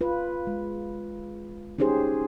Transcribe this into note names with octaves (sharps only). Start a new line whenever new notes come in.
F4 B4
G#3
C#4 D#4 G4 G#4 C5